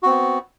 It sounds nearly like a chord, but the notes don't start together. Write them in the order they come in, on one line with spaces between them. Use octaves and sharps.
F#4 C4 B3